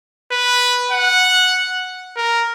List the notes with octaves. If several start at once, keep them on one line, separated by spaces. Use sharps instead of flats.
B4
F#5
A#4